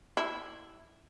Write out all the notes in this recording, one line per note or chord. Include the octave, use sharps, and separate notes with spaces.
E4